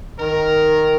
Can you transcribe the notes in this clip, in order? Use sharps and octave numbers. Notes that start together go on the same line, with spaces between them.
D#3 A#4